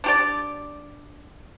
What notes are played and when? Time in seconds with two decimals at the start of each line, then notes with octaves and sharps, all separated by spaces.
0.04 D4 G4 D5